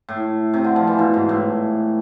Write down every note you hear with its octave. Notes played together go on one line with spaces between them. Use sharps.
A2
C3
D3
F3
E3
B2
G#2
A2